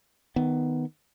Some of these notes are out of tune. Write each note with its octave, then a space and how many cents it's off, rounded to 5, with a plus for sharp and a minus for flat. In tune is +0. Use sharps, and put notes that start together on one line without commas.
D#3 +0 B3 +10